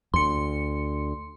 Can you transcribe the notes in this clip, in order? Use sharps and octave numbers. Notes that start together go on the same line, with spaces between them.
D2 C6 C#7